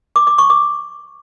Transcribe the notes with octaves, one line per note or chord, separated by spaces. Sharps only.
D6
D6
C#6
D6